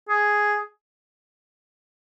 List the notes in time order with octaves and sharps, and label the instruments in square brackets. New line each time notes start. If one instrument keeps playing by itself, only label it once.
[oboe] G#4